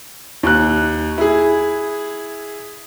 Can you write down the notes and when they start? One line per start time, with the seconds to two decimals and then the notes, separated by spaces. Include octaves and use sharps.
0.43 D#2 F#6
1.18 E4 G#4